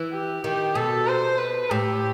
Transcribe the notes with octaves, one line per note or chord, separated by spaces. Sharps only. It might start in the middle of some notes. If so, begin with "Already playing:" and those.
Already playing: E3
G4
D#3 G4
B2 A4
C5
B4
A2 G4